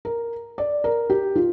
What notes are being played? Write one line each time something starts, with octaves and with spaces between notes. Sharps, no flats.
A#4
D5
A#4
G4
F4